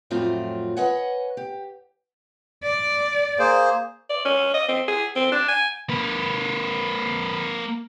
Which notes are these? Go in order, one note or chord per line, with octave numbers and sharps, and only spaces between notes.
F2 A2 F#3 A3 C4 F4
B4 C#5 D#5 F#5 G#5
G4
D5
A#3 G#4 C5
D5
C#4
D#5
C4
G#4
C4
D4
G#5
A#3 B4